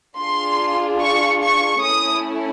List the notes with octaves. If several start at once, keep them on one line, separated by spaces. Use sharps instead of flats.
D4 F4 G#4 C6
C#6
C#6
A3 C#4 E4 D#6